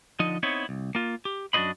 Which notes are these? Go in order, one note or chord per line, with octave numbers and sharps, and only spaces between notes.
D3 F3 D#4 D#5
B3 C4 D#4 E4 C#5
C2
A#3 F4
G4
F#2 D4 F#4 C5 D#5 B5